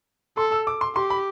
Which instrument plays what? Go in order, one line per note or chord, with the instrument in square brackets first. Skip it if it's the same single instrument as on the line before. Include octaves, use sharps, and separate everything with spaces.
[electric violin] A4 [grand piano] C6
[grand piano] E6
D6
C6
[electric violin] G4 [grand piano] C6
[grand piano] B5